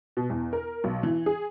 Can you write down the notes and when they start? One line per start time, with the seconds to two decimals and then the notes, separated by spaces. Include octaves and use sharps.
0.17 B2
0.30 E2
0.53 A#4
0.84 B1
1.03 E3
1.26 G#4